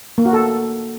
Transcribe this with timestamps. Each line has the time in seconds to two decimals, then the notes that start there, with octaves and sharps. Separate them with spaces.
0.18 A#3
0.26 F#4
0.33 A4